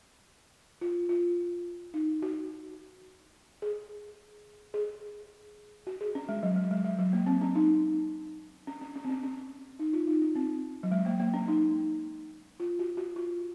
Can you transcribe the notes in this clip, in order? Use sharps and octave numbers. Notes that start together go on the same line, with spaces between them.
F4
F4
D#4
F#4
G#4
G#4
F#4
G#4
C#4
G#3
F#3
G#3
G#3
G#3
F#3
A#3
C4
C#4
D#4
C#4
C#4
C#4
C4
C#4
C#4
D#4
F4
D#4
C#4
C4
F#3
G#3
A#3
A#3
C#4
D#4
F4
F#4
F#4
F4